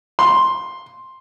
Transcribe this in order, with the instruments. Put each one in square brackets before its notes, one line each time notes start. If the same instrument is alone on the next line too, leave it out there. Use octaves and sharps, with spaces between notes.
[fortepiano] C6